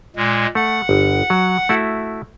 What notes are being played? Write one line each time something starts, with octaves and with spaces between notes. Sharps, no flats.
A#2 G#3
A3 F#5
G1
F#3
A3 E4 F#4